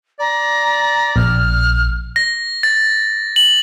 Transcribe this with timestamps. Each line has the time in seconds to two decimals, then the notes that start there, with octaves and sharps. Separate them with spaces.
0.20 D5 A#5
1.16 A#1 F6
2.16 A#6
2.63 A6
3.36 F#7